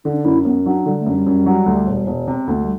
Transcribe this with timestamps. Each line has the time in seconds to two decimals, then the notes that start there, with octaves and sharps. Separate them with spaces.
0.05 D3 D4
0.16 D4
0.24 F#2 E4
0.45 F#2 B3
0.65 F#3 D4
0.86 D3 G3
0.99 A3
1.06 F#2
1.12 G3
1.26 F#2
1.46 F#3
1.66 D2
1.87 E1
2.07 E1
2.28 C3
2.47 D2 B3
2.56 A3
2.63 G3